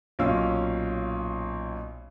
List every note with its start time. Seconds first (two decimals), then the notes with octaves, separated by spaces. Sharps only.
0.19 B1 A#2 C#4 F5 E6